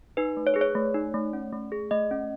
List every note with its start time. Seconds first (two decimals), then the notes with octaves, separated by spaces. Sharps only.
0.17 D#4 B4
0.37 A3
0.47 C#5
0.54 G#4 B4
0.61 C#5
0.75 A3
0.95 D#4
1.14 A3
1.33 C#4
1.53 A3
1.72 G#4
1.91 A3 D#5
2.11 C#4